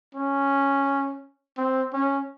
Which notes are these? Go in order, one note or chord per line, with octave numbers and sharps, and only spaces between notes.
C#4
C4
C#4